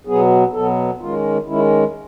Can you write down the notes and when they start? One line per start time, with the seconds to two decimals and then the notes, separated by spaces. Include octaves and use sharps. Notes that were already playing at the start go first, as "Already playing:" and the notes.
0.07 B2 F#3 B3 G#4
0.53 B2 F#3 B3 A4
1.00 D#3 G#3 C#4 F4
1.47 D#3 G#3 C#4 E4